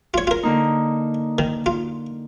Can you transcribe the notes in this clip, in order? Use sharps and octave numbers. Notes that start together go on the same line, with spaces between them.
F4 C#5
F4 A#4
D3 A#3 D#4
D#3
F4